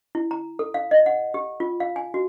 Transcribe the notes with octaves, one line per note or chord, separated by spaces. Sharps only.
E4
A#5
A4
F5
D#5
F#5
G4
F4
F5
G#5
F#4